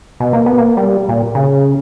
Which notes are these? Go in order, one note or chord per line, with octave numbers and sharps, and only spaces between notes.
B2
A#3
B3
A#3
G3
A#2
C#3